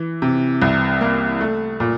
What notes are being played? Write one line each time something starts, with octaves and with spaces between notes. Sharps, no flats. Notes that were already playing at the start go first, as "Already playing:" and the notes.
Already playing: E3
C3
C2
A#3
A3
A#2